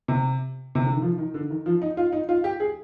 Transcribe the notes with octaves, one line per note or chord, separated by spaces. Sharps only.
C3
C3
D3
D#3
F3
D#3
D3
D#3
F3
D#4
F4
D#4
F4
G4
G#4